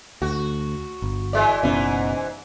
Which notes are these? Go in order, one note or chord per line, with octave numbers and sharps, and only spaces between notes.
D2 F#4
G1
E3 G#3 D5
F#1 G#2 B2 D3 E3 C#4